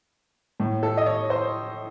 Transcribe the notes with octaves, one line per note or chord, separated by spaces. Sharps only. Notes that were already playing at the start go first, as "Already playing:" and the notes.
A2
A4
D#5
C#5
C5